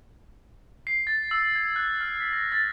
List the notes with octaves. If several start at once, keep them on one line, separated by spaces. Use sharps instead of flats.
C7
A6
E6
G#6
F#6
F6
B6
A#6
A6